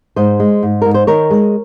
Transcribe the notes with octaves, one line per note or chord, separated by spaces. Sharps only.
G#2 C5 D#5
G#3
G#2
G#2 A#4
C5
D#3 A#4 C#5
G#3